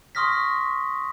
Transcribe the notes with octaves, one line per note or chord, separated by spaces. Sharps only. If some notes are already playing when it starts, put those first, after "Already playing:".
C6 C#6 D#6 F6 A#6 B6